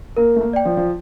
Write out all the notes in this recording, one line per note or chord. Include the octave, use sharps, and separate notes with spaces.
A#3 A#4
A3
A#3
D5 G5
F3
F3